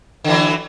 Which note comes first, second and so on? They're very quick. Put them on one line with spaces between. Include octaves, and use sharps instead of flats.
D3 E3 F#3